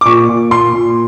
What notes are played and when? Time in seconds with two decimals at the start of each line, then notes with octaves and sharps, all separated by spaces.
0.01 D6
0.05 A#2 C#6
0.29 A#2
0.51 A#2 C6
0.73 A#2